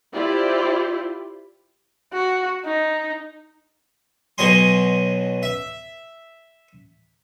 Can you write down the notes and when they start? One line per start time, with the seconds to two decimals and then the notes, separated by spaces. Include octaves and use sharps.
0.13 E4 F4 G4 C5 D5
2.13 F#4
2.65 D#4
4.38 B1 B2 F#3 D#5 G#5 C6
5.43 E5